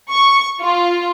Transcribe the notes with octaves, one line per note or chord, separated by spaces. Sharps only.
C#6
F4